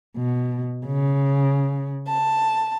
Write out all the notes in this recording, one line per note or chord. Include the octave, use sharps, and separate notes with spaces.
B2
C#3
A5